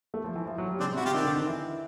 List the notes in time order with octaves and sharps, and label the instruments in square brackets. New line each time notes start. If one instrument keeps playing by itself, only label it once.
[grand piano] A3
F3
E3
F3
F#3
G3
[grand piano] C#3 [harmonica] C4 D4
[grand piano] C3
[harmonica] E4 F#4
[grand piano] C3 [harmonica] F4 G4
[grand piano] D#3 [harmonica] C4 D4
[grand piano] D3
D#3
E3